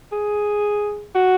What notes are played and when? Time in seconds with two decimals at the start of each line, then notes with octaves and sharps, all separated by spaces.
0.12 G#4
1.15 F#4